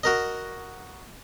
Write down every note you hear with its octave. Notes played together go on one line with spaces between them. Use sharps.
F#4 A#4 D#5